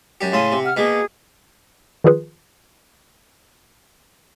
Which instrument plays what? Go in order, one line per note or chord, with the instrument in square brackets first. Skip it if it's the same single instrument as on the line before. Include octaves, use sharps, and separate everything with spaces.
[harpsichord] F#2 G4
[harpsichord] A2 C#3 D#6 [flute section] F5 G#5 C6
[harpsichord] C3
[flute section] F#5 F6
[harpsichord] B2 A#3 [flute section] G#4
[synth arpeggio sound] D#3 F3 F4 G#4 B4